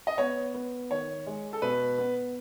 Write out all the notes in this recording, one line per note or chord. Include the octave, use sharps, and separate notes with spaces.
D#5
B3 C#5
B3
D#3 C#5
G#3
A4
B2 B4
B3